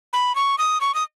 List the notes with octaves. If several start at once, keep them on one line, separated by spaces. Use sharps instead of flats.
B5
C#6
D#6
C#6
D#6